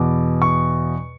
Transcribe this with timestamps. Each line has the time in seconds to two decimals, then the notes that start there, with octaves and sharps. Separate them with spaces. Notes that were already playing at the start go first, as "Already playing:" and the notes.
Already playing: E2 B2 D6
0.42 C#6